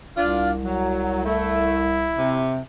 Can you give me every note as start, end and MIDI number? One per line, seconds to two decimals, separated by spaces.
0.17 2.22 36
0.17 0.52 62
0.17 0.52 65
0.63 1.24 54
1.26 1.86 57
1.26 2.49 64
2.19 2.59 48